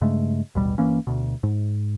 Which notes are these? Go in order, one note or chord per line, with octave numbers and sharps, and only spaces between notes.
G2 C#3 G#3 A3
A1 D#2 B2 G3
G1 E3 A#3 C#4
D2 B2
G#2